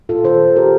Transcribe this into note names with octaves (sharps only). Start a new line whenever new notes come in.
A#2 F4 A4
D#3 A4 C5
D#3
G3 G4 A#4